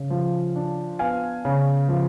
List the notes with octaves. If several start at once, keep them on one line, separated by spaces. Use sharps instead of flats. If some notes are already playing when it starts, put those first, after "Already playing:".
Already playing: C#3
F3
D4
B3 F5 G#5
C#3
F3